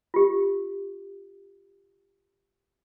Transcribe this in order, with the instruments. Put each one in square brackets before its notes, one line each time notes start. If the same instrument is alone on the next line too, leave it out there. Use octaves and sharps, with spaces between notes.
[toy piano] F4 G4